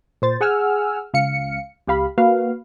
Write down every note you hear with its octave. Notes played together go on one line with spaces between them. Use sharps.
A#2 C5 A6
G#4 F#5 G#5 E6 F6
C#2 F5 C#7
C#2 G4 F5 B5
A#3 F#4 B4 F5